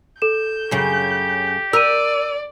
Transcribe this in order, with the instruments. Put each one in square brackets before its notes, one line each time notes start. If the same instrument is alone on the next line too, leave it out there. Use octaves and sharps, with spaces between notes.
[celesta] A4 E7 [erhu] G6
[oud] F#2 C#3 [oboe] G4
[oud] A#4 [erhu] D5 [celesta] E6 D#7